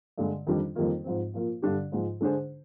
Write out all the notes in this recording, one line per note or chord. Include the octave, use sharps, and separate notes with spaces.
G2 D3 G#3
F2 D#3 G3 D4 F4
F2 D#3 G3 A#3 F4
G#2 F3 C4
A#2 F3 A#3 F4
G2 D3 G3 D4 G4
G#2 F3 G#3
D3 G#3 D4 G#4 C5